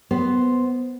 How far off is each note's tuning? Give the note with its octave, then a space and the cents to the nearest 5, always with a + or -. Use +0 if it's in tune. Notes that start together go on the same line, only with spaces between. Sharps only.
B3 +5 C5 +0